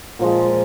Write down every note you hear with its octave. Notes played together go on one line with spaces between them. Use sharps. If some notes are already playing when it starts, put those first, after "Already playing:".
A#2 F3 G#3